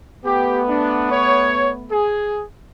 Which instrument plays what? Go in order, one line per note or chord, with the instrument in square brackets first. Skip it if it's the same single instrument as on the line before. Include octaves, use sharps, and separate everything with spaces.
[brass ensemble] A3 B3 [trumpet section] G4
[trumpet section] D4
C#5
G#4